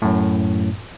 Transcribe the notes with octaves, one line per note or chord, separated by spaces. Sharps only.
F#2 A2